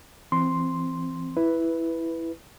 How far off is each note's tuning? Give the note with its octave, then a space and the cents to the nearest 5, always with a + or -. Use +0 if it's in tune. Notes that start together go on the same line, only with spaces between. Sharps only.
E3 +25 C4 +0 C6 +0
E4 +0 B4 +0